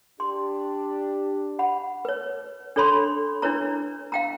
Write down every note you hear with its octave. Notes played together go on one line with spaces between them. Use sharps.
D4 G4 C6
F#5 B5
B4 C#5
D4 A4 C#5 B5 C6
D4 E4 B4 C#5 A#5
F5 G5 A#5